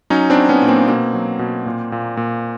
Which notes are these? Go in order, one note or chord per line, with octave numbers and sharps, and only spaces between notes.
F#3 C#4 D#4
C4 D4
F#3
B3 C#4
A#2
A#3 C4
B2 A#3 C4
F#3
B2
A#2
A#2
A#2